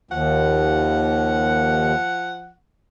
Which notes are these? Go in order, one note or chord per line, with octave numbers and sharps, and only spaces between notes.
D#2 F3 F#5